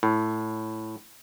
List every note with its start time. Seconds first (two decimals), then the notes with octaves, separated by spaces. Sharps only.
0.03 A2